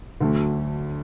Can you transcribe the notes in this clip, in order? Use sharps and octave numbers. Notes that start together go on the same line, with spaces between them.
D2 D3 F#3 A3